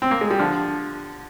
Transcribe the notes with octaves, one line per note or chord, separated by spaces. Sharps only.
C4
A#3
G#3
G3
D3 F3